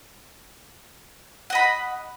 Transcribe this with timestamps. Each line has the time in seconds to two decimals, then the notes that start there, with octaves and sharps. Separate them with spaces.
1.50 F#5
1.53 D#5
1.55 B5